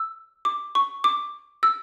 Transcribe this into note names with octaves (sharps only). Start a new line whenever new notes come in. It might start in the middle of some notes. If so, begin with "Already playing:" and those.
Already playing: E6
D6
C#6
D6
E6